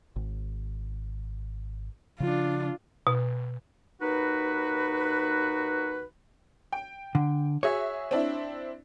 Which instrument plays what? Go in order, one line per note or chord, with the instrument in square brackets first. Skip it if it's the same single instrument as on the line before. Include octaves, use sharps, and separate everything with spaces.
[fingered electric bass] G#1
[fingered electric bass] C#3 F3 [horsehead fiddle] D4 F4
[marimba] B2
[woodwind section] D#2 D#4 F#4 B4
[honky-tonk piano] G5
[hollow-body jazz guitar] D3
[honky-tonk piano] F#4 G#4 E5 [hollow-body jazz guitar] C#5
[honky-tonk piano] C4 D4 E4